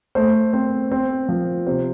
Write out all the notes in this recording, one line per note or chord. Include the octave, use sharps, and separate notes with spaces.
A3 C5
C4
C4
F3
C3 C5